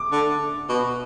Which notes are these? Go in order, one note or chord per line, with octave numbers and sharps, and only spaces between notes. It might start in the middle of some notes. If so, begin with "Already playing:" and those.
Already playing: D6
D3
B2